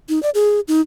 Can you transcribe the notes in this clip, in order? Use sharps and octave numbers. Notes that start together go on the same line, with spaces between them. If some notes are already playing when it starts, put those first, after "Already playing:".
D#4
D5
G#4
D#4